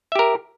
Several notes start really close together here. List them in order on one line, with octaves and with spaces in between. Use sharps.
E5 G4 A#4